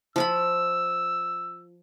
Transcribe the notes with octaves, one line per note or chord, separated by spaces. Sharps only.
F3 F4 B5 E6